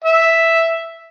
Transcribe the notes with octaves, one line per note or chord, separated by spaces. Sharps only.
E5